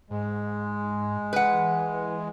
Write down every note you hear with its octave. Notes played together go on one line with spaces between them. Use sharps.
G#2 G#3
E3 B4 F#5